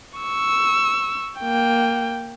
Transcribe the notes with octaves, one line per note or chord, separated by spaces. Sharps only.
C#6 E6
A#3 G5